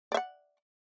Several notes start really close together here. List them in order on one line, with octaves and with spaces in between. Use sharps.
D5 E5 F#5